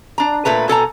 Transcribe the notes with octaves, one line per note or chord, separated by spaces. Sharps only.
D4 A#5
A#2 A3 B4 A#5
B2 A4 G#5 A#5